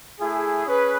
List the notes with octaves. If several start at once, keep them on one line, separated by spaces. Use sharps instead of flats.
A3 E4 G#4
C#4 G#4 B4